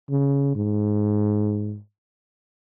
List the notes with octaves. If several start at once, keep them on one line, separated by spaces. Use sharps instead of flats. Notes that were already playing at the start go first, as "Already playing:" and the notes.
C#3
G#2